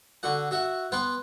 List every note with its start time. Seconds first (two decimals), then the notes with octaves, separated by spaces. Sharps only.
0.23 D3 F#4 F#5
0.51 F#4 E5 F#5
0.92 B3 F#5 G5 C6